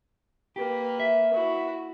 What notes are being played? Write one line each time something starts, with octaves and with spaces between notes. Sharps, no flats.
A#3 G4 B4
E5
E4 F#4